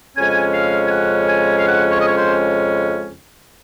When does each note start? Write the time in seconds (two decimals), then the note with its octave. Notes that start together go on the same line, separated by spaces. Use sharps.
0.16 F2 C#3 G#3 C#4 G#5
0.54 F5
0.86 G#5
0.91 F#5
1.29 G#5
1.57 F5
1.66 F#5
1.91 C#5
1.99 D#5
2.08 C#5
2.16 C5